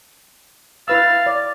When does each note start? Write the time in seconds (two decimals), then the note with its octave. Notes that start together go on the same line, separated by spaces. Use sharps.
0.88 E4 B4 F5 E6 A6
1.26 D5